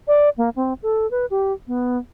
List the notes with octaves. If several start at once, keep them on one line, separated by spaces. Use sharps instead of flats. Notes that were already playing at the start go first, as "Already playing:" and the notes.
D5
A#3
C4
A4
B4
G4
B3